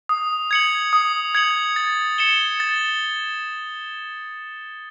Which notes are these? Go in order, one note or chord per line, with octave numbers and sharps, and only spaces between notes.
D#6
G#6 C#7 F#7
D#6
G#6 C#7 F#7
A6
C#7 E7 G7
A6